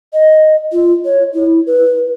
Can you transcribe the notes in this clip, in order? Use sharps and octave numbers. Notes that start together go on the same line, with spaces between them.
D#5
F4
C#5
E4
B4